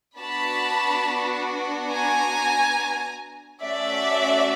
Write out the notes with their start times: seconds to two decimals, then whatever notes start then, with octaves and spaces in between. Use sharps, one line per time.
0.18 B3 D4 F#4 A5 B5
1.91 G#5 A#5
3.62 A3 C#4 F#4 D5 E5